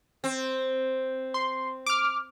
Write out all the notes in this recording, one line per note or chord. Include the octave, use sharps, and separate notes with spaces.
C4
C6
D6 F6